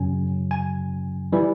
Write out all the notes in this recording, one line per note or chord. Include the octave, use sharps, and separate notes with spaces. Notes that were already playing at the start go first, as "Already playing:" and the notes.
Already playing: F#2 C#3 F#3 G#5
G#5
E3 G3